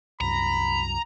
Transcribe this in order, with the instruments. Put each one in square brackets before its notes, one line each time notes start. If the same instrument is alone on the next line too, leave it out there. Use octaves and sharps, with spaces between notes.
[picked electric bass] C2 F#2 [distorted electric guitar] A#5 [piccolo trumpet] B5